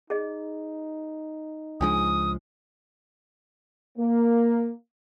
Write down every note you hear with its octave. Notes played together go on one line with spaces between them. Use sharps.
D#4 G#4 D#5
C#2 F3 G#3 D4 G#5 D#6
A#3